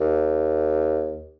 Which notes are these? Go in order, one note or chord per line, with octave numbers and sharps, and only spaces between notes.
D#2